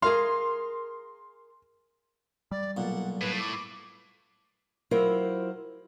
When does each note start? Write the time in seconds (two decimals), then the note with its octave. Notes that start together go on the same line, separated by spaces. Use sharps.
0.02 G#4 A#4 F5 C6
2.51 G3 D5
2.77 B1 A#2 F#5
3.21 A2 B4
3.39 D6
4.91 F#3 E4 F4 A#4 C5